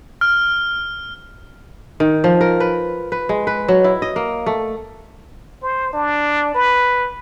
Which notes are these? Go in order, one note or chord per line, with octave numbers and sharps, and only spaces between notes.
F6
D#3
F3
A#4
B4
B4
G#3
B4
F#3
E4
D#5
A#3
A3
C5
D4
B4